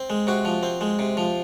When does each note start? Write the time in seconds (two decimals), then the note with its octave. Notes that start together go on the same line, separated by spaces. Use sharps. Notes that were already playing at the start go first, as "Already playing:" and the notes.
Already playing: C4
0.10 G#3
0.27 C3 F#4
0.45 F3
0.63 C4
0.81 G#3
0.99 C3
1.17 F3